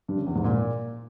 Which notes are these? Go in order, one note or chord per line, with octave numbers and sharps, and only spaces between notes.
G2
C#3
E2
G#2
A#2